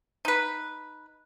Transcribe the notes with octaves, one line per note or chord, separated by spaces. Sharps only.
D#4 B4